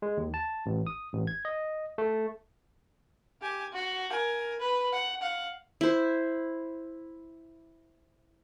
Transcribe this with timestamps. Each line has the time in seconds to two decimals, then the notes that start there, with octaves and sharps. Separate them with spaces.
0.02 G#3
0.17 D#2
0.34 A5
0.66 A1
0.87 D#6
1.13 A1
1.27 G#6
1.45 D#5
1.98 A3
3.42 G4 G#5
3.73 F#4
4.11 A#4 G#5
4.60 B4
4.92 F#5
5.22 F5 F#5
5.81 E4 C5